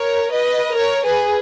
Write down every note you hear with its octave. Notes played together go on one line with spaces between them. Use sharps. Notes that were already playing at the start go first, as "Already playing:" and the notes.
Already playing: A#4 C#5
B4 D#5
A#4 C#5
G#4 B4